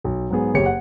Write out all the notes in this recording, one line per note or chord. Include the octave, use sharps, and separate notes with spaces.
B1
G#2 F#3 B3 G#4
F#1 G4 C#5 C#7
F#5